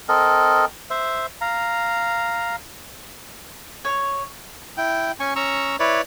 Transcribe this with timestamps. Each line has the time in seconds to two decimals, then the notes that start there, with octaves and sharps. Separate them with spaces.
0.09 C4 A4 A#4 D#5
0.90 C5 E5
1.41 F5 A#5
3.85 C#5
4.77 E4 G5
5.20 C#4 G#5 C#6
5.36 C#4 A#5 C#6 E6
5.79 E4 B4 C#5 D5